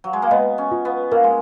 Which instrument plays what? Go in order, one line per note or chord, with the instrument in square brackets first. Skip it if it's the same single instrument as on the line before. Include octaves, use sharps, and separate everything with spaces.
[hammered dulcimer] F#3
G#3
A#3
[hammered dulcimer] B3 [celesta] D#5
[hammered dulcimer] C#4
[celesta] F4
[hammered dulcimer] B3
[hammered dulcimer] A#3 [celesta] A#4
[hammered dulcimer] G#3